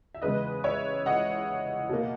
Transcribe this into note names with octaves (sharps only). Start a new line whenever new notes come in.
E5
E2 C#3 G#3 B4 D#5
C#5 E5
D#5 F#5
B2 A#3